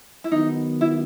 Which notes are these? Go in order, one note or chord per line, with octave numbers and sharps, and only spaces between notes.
E4
D#3 F#3 B3 D#4
E4